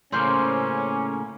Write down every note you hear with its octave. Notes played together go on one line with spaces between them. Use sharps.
A2 C#3 A#3 C4 C#4 C5 F6